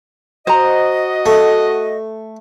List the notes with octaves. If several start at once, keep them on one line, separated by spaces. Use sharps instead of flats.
F#4 C5 D#5 A#5
A3